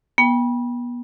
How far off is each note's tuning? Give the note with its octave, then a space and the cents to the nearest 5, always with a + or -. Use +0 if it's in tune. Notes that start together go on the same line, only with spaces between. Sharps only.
B3 -30 G5 +20